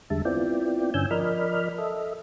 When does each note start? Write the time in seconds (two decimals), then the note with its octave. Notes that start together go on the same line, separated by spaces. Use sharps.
0.10 E2 D3 G3 G#3 E5 A5
0.25 B3 C4 E4 F4 D5 G5
0.94 G2 D3 C#4 G#5 E6 G6
1.11 F3 A#4 D5 D#5 B5 F6
1.78 A4 D#5 E5